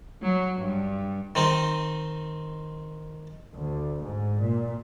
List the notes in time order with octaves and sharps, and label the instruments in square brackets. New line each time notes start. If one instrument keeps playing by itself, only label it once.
[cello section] F#3
G2
[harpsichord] D#3 C4 D#4
[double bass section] D2
G#2
A#2